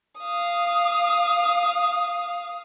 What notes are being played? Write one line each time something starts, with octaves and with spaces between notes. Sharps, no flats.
F5 D#6